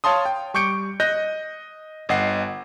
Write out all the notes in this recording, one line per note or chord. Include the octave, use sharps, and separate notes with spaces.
C#5 F5 A5 C6 D#6
G5
G3 C#6 D6 G6 C#7 D7
D#5 F#6 G6 A#6
G1 D#5 F#5 C7